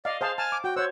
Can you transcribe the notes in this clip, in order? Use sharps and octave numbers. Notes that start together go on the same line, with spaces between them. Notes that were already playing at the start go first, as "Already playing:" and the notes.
D5 D#5 F5
G#4 C5 F5 A5
G#5 A5 F6
D6
F#4 G5
C5 C#5 F#5 E6